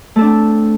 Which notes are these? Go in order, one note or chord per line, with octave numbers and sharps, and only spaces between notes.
A3 C4 D4 A4